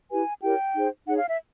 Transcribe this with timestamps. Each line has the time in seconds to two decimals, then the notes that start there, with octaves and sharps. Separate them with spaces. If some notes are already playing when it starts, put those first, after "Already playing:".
0.10 E4 G4 B4 G#5
0.42 E4 G4 A#4 C#5 G5
0.75 D#4 G#4 C5
1.07 D#4 G#4 C#5 F#5
1.18 F5
1.28 E5